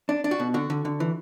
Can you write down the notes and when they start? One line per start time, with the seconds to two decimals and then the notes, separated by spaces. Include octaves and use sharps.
0.09 D4
0.24 D4
0.31 F#4
0.40 B2
0.54 D3 F#4
0.70 D3
0.85 D3
1.00 E3